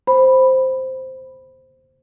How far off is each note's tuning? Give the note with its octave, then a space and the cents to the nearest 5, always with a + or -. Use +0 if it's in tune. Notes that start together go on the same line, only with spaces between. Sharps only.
C5 +0 B5 +0